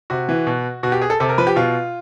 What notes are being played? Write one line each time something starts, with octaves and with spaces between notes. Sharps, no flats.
C3 F#4
E3
B2
B2 F#4
G4
G#4
A4
C3 A4
A#4
F3 B4
G4
B2 F4